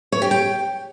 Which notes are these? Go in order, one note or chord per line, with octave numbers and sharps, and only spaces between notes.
C#5
G4
G5